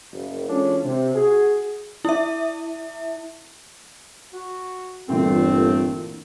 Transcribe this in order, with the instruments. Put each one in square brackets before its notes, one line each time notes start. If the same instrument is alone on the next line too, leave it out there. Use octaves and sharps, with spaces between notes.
[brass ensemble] F#1
E3 G#3 C#4 D4 F4 A4
C3
F#4 G#4
[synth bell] E4 E5
[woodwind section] F#4
[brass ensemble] G1 [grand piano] A#2 D3 E3 [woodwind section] A3 C4